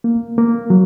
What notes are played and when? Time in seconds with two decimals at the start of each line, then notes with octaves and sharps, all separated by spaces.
0.04 A#3
0.38 A#3
0.70 F#3